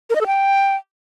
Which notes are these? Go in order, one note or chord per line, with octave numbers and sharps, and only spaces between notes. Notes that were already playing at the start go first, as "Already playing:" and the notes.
A#4
D#5
A4
G5